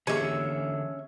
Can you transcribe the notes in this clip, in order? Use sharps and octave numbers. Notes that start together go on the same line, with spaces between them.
D3 E3 A#3 C#4 G4 G#4 E5